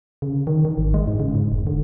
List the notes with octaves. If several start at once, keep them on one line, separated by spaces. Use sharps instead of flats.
C#3
D#3
D#3
G#1
G#3
G#2
C#3
G#2
F1
D3